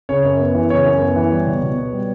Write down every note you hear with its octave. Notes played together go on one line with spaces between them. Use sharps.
C#3 C#5
F#2
B3
E3
C#3 C#5
F#2
B3
E3
G3
B2
B2
B3
G3